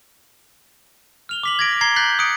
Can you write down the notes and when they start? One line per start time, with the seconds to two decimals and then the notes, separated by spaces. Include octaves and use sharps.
1.29 F6 F7 G7
1.43 D6 B6 F#7
1.59 G#6 A#6 D7
1.81 A#5 G#6 C7 G7
1.96 F#6 G6 A6 B6 C7 F#7
2.19 D#6 F#6 C#7 D7